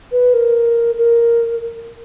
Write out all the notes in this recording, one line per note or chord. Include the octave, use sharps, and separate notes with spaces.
B4
A#4
A#4